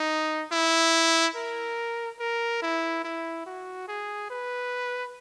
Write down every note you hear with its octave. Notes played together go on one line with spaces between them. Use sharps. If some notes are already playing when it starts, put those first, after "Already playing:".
Already playing: D#4
E4
A#4
A#4
E4
E4
F#4
G#4
B4